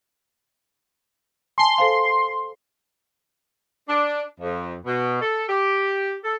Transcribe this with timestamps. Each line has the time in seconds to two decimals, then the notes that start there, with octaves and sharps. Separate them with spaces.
1.58 G#5 A5 C6
1.78 A4 C5 F5
3.88 D4
4.40 F2
4.86 B2
5.21 A4
5.48 G4
6.24 A4